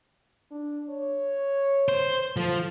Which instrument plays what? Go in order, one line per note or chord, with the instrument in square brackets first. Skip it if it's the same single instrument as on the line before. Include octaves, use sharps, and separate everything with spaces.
[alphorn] D4
C#5
[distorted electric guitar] C5
[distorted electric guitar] F3 [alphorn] A4